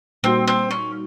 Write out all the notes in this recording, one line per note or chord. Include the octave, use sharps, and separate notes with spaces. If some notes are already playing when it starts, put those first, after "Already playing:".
A#2 G3 A#3 C4 D#4 F#4
C4
C#4